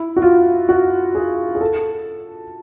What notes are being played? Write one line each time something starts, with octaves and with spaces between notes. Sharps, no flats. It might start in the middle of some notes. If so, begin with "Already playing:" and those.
Already playing: E4
F#4
F4
F#4
G#4
G#4
A4